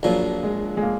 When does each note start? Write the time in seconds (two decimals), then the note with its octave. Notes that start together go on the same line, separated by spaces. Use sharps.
0.03 A#1 A#2 F3 F#3
0.43 G#3
0.77 G#3
0.83 A#3